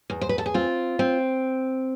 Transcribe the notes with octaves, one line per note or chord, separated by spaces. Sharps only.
E2
C5
B4
A4
G#4
C4 F4
C4